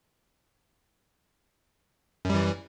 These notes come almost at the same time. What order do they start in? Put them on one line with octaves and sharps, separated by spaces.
F#2 G3 E3